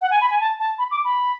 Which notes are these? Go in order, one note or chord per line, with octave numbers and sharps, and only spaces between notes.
F#5
G#5
B5
G#5
A5
A5
B5
D6
B5